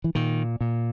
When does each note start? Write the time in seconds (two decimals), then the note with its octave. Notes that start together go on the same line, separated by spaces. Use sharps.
0.04 E3
0.15 A#2 D#3
0.61 A#2